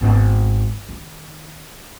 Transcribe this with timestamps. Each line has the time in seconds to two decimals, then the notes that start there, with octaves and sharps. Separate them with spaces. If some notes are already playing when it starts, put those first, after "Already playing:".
0.01 G#1 B3
0.89 D#3